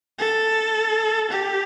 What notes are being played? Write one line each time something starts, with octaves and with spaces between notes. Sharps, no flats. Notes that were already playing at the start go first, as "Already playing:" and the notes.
A4
G4